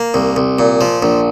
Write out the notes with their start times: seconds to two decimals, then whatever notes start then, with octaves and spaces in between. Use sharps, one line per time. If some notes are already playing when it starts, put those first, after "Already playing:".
Already playing: A#3
0.14 C2
0.36 C2
0.59 A#2
0.81 F3
1.03 A#1